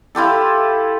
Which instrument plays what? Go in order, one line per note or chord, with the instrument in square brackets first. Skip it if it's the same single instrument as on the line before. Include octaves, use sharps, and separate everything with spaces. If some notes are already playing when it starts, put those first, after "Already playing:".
[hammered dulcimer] E4 F4 G4 A4